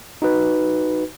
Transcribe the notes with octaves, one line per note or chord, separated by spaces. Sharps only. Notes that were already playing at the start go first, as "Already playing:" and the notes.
D#4 F#4 B4